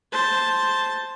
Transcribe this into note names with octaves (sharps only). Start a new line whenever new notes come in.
C5 A5